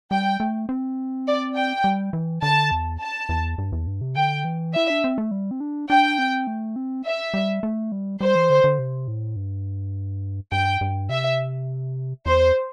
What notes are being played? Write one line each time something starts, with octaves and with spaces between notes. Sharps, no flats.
G3 G5
A3
C4
D5
G5
G3
E3
D3 A5
E2
A5
E2
G2
E2
G2
C3
D3 G5
E3
E4 E5
D4
C4
A3
G3
C4
D4
D4 G5
C4
A3
C4
E5
G3
A3
G3
G3 C5
E3
D3
D3
C3
A2
G2
G2 G5
G2
C3 E5
E2 C5